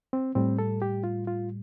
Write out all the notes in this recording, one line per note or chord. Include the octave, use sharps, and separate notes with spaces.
C4
A2 G3 C4
A4
G4
F4
F4